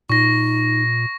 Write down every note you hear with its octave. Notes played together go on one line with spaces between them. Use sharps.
A#2 D#4 C#6 A#6